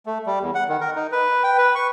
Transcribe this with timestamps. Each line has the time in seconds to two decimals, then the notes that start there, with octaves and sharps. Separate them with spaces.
0.06 A3
0.26 G3
0.41 E2
0.55 F#5
0.69 D#3
0.81 A#4
0.96 D#4
1.12 B4
1.44 G5
1.58 B4
1.75 C#6